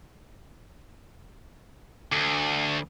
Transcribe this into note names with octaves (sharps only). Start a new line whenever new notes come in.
D2